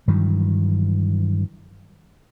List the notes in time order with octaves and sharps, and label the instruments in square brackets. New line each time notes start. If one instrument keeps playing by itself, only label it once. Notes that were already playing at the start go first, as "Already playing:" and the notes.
[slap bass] G2 D#3 E3 F#3